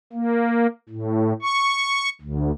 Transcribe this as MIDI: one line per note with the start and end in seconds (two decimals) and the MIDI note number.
0.13 0.67 58
0.89 1.33 45
1.42 2.09 85
2.21 2.51 38